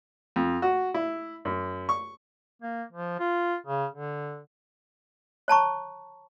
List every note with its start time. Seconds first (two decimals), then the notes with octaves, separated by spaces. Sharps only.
0.36 F2
0.62 F#4
0.94 E4
1.45 F#2
1.89 C#6
2.62 A#3
2.92 F3
3.19 F4
3.67 C#3
3.94 D3
5.48 C#5 A5 A#5 C#6